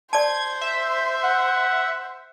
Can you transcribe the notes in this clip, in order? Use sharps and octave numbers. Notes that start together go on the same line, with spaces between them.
C5 D5 A5 G#6
E5
F#5